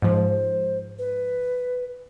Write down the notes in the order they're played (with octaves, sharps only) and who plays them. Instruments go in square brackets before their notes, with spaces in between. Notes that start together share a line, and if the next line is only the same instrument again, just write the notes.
[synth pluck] G#2 F3 [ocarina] C5
[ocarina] B4